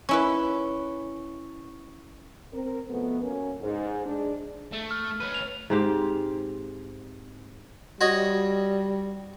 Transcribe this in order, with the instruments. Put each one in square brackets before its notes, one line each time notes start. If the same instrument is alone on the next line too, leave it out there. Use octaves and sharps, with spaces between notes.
[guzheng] C#4 E4 B4 [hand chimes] C#6
[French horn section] C4 A#4
B2 F3 A3 B3
F#3 A#3 C#4
G#2
G#3 D4
[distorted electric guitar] A3
[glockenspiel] F6
[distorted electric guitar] C#4 B4
[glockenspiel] F7
[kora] G#2 C4 G4
[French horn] G3 [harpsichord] F#4 C#5 D#5